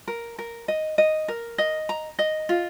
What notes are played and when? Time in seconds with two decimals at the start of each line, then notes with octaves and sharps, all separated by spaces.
0.08 A#4
0.39 A#4
0.68 D#5
0.98 D#5
1.28 A#4
1.58 D#5
1.89 A#5
2.19 D#5
2.49 F4